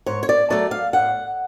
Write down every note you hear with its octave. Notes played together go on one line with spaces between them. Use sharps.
G#2 C#5
C#5
D5
F#3 A3 D5
F5
A2 F#5